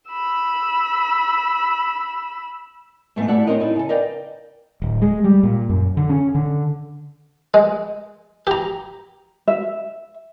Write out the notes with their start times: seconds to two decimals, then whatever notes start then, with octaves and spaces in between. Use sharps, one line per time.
0.10 B5 E6
3.16 G#2 B2 E3 A3 C4
3.28 A3 E4 G4 D5 F#5
3.47 C4 C#4 F#4 A#4 D#5
3.60 D#4 E4 A4
3.76 C#3 A4
3.89 A#4 B4 D5 D#5 F5 G5
4.82 D1
5.02 G#3
5.24 G3
5.43 A#2
5.70 F#2
5.97 D3
6.09 C#4
6.35 D3
7.54 G#3
8.47 G4 A#5
9.48 E5